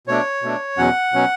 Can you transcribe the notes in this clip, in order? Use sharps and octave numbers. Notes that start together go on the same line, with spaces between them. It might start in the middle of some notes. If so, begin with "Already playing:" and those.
B2 A3 D4 C#5
B2 A3 D4
E2 B2 F#3 C#4 F#5
B2 F#3 C#4